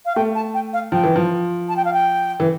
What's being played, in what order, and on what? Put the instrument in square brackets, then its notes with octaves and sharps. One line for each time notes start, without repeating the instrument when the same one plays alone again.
[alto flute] F5
[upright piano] A3 [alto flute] G5
[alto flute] A5
G5
F5
[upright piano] F3 [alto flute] G5
[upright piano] E3
F3
[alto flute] A5
G5
F5
G5
[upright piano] E3